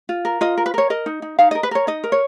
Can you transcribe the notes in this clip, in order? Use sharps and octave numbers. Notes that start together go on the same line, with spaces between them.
F4
A#4
F4 D#5
A#4
B4
A#4 C#5
A#4 D#5
D#4
D#4
D#4 F5
A#4 D#5
B4
A#4 C#5
D#4 D#5
A#4
C#5